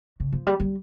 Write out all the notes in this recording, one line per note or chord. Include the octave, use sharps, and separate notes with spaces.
C#3
F3
G3
G3